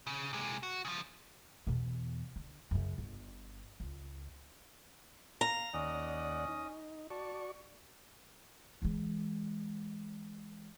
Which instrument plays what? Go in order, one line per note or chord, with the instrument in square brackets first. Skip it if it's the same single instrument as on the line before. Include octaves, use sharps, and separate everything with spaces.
[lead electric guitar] C#3
C3 G#3
F#4
C#3 F3
[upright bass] E2 B2
D3
F#2 C#3
G1
C#2
[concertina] F5 [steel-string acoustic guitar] A#5
[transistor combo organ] D#2 D5 F#5 [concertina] C#4 D#5 D#6
[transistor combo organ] D#4
[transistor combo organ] F#4 D5 C#6 [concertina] A5
[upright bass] E3 G#3